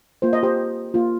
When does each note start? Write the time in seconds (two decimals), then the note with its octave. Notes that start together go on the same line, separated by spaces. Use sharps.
0.22 A#3 F4 C5
0.33 D#5
0.43 G4 C5
0.94 A#3 F4